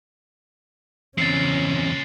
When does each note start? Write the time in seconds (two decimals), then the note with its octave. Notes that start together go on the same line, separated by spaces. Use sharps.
1.18 E2 A#2 C#3 G#3 C4 C#4 A6 C7